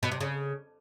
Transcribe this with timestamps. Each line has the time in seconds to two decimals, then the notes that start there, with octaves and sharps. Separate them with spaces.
0.03 B2
0.12 C3
0.20 C#3